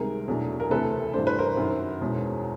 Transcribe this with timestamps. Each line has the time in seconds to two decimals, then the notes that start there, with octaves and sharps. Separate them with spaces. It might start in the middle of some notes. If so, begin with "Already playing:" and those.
Already playing: C#2 C3 D#3 G3 G#4 A#4
0.28 E2 B2 F#3 A3 D4
0.60 A#4
0.70 D2 C3 E3 A4 B4
1.14 G2 E3 A3 D4 C5
1.27 B4
1.38 A#4 C5
1.57 F#2 D#3 F#3
2.01 E2 B2 G#3 C#4